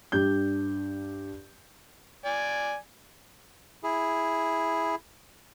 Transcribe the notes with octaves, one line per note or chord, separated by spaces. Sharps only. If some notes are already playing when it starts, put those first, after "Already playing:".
G2 D4 G4 G6
D5 G#5
E4 G#4